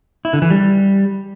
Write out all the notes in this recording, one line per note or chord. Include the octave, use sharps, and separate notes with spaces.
E4
D3
E3
G3